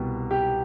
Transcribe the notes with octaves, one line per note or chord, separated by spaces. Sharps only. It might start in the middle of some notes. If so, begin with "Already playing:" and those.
Already playing: C2 B2 G4
G4